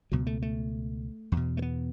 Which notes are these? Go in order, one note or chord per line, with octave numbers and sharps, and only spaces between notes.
C#2 B2 F#3
A3
A3
E2
B2
A3
B3